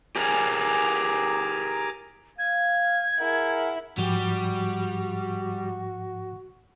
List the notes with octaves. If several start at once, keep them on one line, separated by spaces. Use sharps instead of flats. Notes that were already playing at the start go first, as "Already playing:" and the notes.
G4 G#4 A#4 G#5 A#5 D6
F5 G#6
E4 G#4 A#4 F#5
G#2 F3 G3 F#4 G4